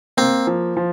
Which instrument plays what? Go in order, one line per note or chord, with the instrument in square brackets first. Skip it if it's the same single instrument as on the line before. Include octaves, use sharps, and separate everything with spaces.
[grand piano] A#3 [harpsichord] C4
[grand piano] F3
F3